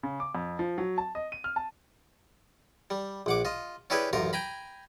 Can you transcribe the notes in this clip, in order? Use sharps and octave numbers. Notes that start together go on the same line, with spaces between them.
C#3
D6
F2
F3
F#3
A5
D#5
D#7
F6
A5
G3
A#1 F#5 D6
F4 D#5
C#4 D4 E4 G4 G#4 B4
A1 F#2 F4 A#4
G5 G#5 A#5 B5